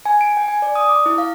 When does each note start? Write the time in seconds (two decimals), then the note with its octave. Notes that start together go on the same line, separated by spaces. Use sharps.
0.05 G#5
0.21 D7
0.37 G5
0.48 G#5
0.62 D5
0.75 D#6
0.89 D6
1.06 E4
1.18 F5